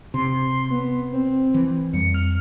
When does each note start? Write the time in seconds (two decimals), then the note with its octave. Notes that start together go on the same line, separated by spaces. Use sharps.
0.14 C3 C6
0.70 B3
1.12 C4
1.54 E3
1.93 F2 G3 C#7
2.14 F6